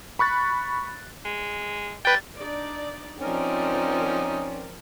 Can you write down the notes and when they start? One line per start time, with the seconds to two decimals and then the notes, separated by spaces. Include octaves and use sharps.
0.19 B5 C#6 F#6 A6
1.25 G#3
2.05 G3 B4 G5 A6
2.37 D4 D#4 D5
3.21 F3 C4 C#4 D#4 A#4 D5